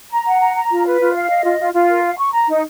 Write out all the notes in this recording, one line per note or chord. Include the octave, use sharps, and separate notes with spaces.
A#5
F#5
A#5
A#5
F4
B4
F4
F5
D#5
F4
F4
F4
A#4
F5
C#6
A#5
D#4